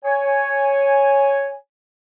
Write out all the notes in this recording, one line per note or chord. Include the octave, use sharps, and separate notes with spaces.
C#5 G#5